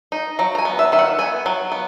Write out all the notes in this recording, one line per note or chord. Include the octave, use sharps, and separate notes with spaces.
D#4
F#3 A#5
A#5
G#5
B3
E5
D#3 E5
F#5
B3 G#5
F#3
B3